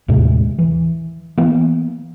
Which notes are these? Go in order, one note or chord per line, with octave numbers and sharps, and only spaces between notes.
D#2 A2 C3 G#3
E3
E3 A#3 B3